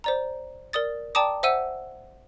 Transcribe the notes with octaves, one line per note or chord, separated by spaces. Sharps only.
C5 D5 A#5
A#4 D5 D#6 A6
D5 G5 A5 A#5 D6 D#6
C5 E5 F#5 E6 D#7